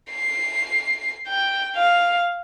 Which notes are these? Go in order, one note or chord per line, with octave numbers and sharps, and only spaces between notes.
C7
G5
F5